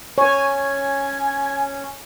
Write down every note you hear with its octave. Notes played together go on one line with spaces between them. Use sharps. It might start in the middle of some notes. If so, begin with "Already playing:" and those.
C#4 C#5 G#5